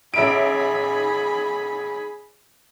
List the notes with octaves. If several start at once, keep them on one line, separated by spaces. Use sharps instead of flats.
A1 G#4 E5 B5 D7